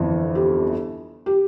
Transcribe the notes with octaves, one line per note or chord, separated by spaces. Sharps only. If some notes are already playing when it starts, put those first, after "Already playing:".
Already playing: G1 F2 E3
G4
G4